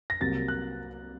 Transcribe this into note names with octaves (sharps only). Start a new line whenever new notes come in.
A#6
C2 C3 F#3 A#3 A6
F#6